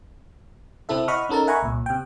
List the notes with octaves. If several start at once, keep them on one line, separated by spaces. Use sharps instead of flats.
C3 C4 E4 A4 E5
D#5 F#5 B5 C#6 D#6 F6
C#4 D#4 A4 A#4 A5
E5 F#5 G#5 A#5 B5 C#6
C2 A#2
C3 G5